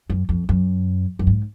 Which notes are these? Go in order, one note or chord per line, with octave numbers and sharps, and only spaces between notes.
F#2
F2
F#2
F#2
G#2